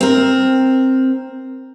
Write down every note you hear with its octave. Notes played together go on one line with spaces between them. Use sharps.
C4 A#4